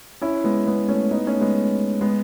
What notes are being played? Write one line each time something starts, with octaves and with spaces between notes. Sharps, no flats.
C#4 E4
G#3 B3
G#3 B3
A3 C#4
B3 D#4
A3 C#4
G#3 B3
G#3 B3